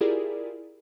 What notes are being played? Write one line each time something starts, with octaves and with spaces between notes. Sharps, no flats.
E4 F4 G4 G#4 A#4 D5